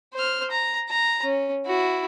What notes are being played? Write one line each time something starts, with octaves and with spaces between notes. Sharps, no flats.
C5 F6
A#5
A#5
C#4
E4 F#4